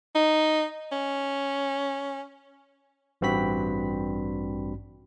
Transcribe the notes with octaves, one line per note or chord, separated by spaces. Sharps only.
D#4
C#4
A1 G2 C4 F#4 B5 B6